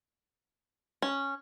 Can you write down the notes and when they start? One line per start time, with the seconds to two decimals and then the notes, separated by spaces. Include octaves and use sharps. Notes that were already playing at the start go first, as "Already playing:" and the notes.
1.02 C#4